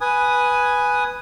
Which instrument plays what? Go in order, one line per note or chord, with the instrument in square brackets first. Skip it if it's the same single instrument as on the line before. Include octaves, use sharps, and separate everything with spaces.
[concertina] B4 G#5 D#6